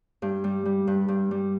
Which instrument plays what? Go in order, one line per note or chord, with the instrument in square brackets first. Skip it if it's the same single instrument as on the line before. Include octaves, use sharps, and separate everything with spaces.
[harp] G2
G3
G3
G2
G2
G3